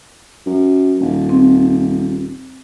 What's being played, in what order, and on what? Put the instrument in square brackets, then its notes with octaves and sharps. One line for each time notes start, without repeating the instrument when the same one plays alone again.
[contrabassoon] F#2
D#1
[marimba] C4